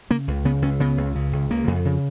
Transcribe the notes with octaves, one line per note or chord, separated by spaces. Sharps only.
C#3 A#3
C#2
C#3 B3
C#2 C#4
C#3 B3
C#2
C#3
C#2
C#3 A#3
F2
C#3